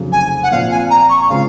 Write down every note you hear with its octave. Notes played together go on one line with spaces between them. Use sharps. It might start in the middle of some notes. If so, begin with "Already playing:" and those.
Already playing: F1 F2 C#3 F#3
G#5
F#5
A#2 F3 C4 F4 F5
G#5
A#5
C#6
C#3 G#3 C4 F4 F5